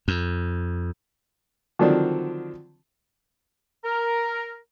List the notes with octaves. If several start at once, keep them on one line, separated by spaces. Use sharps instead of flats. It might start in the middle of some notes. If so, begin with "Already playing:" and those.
F2
D3 D#3 F3 F#3 C4 D4
A#4